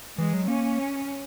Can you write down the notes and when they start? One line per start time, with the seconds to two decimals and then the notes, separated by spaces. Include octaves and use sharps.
0.18 E3 G#3
0.33 F#3
0.47 A#3 C#4